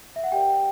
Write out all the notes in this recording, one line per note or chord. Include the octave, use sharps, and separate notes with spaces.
E5
F#5
G4 A#4 D5 G5